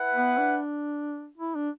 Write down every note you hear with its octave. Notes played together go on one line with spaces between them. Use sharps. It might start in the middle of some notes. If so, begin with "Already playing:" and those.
Already playing: E4 B4 F#5
B3
D4
E4
D4